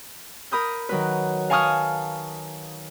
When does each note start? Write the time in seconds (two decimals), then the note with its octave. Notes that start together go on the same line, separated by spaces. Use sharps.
0.52 A#4 B5 D#6 G6
0.89 D#3 F#3 B4
1.50 F5 G#5 A5 C#6 D#6 F6